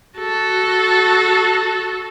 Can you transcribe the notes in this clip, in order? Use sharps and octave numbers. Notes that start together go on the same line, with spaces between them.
F#4 A4